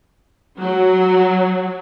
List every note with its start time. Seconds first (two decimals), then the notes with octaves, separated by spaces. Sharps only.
0.60 F#3